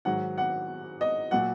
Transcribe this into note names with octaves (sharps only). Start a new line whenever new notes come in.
G#2 D#3 F#3 F#5
F#5
D#5
A#2 F#3 F#5